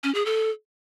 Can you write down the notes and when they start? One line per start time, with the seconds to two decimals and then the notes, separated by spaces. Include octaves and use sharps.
0.04 C#4
0.15 G#4
0.26 A4